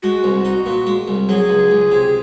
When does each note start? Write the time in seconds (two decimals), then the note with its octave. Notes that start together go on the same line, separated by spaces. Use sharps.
0.03 G#3 F#4
0.24 C2
0.45 D#4
0.66 A#2
0.86 G#3
1.08 C2
1.29 F#3 G#4
1.49 C#2
1.71 C#2
1.92 C3